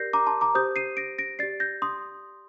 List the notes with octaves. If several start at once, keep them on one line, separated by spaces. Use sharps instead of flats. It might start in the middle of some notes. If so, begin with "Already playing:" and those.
Already playing: G4 A#4 D5 G6 A#6 C7
A#5 D6
A5 C6
A#5 D6
G4 C5 D#6 G6
C7 D#7
A#6 D7
A#6 D7
G4 D5 A6 C7
G6 A#6
C6 D#6